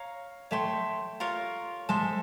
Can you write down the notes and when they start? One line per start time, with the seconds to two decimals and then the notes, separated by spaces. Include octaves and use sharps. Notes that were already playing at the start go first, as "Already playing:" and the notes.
Already playing: C#5 F5 A#5
0.51 A3 C#5 E5 G5 C6
1.20 F4 A#4 C#5
1.89 G#3 A4 C5 E5